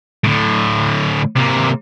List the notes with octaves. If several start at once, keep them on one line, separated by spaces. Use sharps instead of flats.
A2 D3
C3 A#3